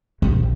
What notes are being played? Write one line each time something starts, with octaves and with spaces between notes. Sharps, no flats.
A#1